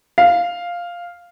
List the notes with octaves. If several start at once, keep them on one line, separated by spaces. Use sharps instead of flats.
F5